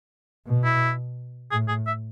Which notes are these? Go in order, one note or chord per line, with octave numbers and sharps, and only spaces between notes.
B2
E4
A2 G#4
G#4
E5